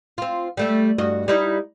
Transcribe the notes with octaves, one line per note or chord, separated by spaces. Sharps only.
C4 F4
G3 A3 E5
G2 F#4 D#5
G3 D#4 E4